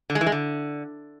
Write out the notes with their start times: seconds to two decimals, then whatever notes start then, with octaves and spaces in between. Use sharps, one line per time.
0.10 D3
0.15 G#3
0.21 E3
0.26 G#3
0.32 D3